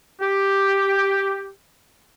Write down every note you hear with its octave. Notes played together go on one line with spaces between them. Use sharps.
G4